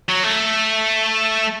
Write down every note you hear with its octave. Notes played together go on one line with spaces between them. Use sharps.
F#3
A3